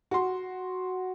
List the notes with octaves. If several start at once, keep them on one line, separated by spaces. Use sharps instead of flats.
F#4 C6